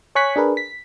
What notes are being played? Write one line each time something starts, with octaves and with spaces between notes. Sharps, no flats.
C#5 G#5 C#6 F#6 B6
D4 G#4 A#4 B4
B6